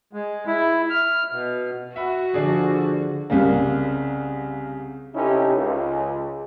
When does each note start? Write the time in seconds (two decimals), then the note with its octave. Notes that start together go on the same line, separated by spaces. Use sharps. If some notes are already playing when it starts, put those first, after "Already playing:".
0.13 G#3
0.47 E4
0.90 F6
1.32 B2
1.96 F#4 E5 F#5 B5
2.34 D3 F3 D4 G#4
3.30 C2 C#3 A#3
5.15 C3 C#4 D#4 E4 G4 A4
5.55 C#2